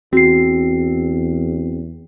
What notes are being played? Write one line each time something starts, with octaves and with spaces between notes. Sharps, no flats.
E2 C4 F#4 C7